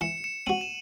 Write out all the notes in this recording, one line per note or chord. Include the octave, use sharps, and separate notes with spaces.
E3 C#7 E7
C#7 E7
C4 F#4 D#7 F#7
E7